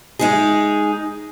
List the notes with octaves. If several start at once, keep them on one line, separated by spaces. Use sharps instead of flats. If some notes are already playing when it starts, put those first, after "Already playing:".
G#3 D#4 G#4